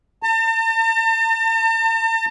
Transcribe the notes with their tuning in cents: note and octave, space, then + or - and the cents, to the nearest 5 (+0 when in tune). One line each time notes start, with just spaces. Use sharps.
A5 +45